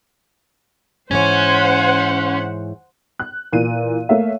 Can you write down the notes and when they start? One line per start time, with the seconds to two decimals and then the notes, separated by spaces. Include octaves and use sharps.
1.11 G#2 E3 C#4 C5 C#5 F#5
3.19 F#6
3.53 A#2 E3 D#7
4.09 A3 A#3 C#5 E5 F5